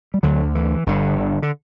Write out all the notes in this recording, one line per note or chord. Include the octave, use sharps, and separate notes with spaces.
G3
D2 D3 F#3
E3
G1 G2 D3
D3
D3